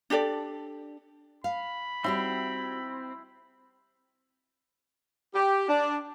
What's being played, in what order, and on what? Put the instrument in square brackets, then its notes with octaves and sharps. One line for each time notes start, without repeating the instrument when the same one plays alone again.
[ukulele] D4 G4 A4 D5
[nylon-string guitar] F5 [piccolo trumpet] B5
[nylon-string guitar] G3 F#4 G4 [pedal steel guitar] C4 [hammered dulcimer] E4
[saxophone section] G4
D4